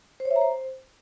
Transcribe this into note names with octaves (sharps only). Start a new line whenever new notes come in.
C5
C#5
E5
A#5
C5